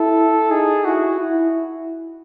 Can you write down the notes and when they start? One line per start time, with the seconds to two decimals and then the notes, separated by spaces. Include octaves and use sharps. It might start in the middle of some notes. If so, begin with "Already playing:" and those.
Already playing: E4 A4
0.50 D#4 G#4
0.85 E4 F#4
1.19 E4